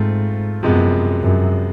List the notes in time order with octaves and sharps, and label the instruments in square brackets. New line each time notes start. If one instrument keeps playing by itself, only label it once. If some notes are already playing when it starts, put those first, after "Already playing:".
Already playing: [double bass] G#2 [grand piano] A3 C4 F4
[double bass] F#2 [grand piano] C3 F3 G#3 B3
[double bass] F#2